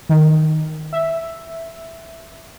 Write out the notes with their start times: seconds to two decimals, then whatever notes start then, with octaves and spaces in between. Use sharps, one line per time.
0.09 D#3
0.93 E5